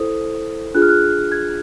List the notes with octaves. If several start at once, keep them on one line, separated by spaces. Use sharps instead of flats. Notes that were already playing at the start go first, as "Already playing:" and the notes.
Already playing: E4 A4 C5 D#6
D4 F4 G#4 F#6
F6
F#6
G#6